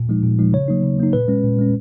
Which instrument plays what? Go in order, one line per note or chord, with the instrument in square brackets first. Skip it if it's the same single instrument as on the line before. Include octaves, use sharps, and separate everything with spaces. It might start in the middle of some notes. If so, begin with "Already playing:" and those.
Already playing: [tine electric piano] A#2
F3 G#3 D#4
A#2
F3 G#3 D#4
C#3 C#5
F#3 A#3 D#4
C#3
F#3 A#3 D#4
A#2 B4
G#3 C#4
A#2
G#3 C#4